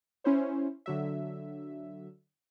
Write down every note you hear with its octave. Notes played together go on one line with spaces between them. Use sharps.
C#4 E4 C5 C#5
D3 F#3 E5